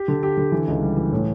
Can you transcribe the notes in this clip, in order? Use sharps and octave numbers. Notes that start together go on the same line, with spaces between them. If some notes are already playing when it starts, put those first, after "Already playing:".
Already playing: G4
D3
G4
D3
E3
C#2
G3
E3
A2